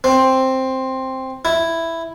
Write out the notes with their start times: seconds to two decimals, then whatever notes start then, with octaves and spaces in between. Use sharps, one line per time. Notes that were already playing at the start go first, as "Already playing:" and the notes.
0.04 C4
1.45 E4